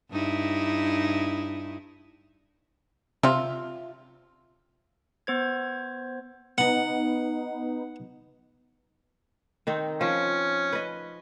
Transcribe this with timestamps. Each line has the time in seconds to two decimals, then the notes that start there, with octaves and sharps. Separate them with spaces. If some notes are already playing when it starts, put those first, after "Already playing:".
0.11 G2 D#4 E4
3.23 C3 F4 E5
5.27 B3 C5 G#6
6.58 B3 D#4 F#5
9.67 D#3 C4 D#4
10.01 F3 C#4
10.72 B4 D#5